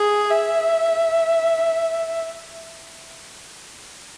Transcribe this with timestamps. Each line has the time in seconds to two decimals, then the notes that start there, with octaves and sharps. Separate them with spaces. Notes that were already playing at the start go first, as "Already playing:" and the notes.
Already playing: G#4
0.31 E5